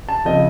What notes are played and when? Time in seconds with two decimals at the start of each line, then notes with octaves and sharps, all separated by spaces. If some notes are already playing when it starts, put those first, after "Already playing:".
0.09 A5
0.25 C#3 F3 C4 D#5